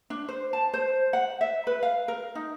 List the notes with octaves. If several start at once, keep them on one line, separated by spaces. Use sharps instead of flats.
D4
C5
A5
C5
F#5
E5
B4
F5
A#4
D#4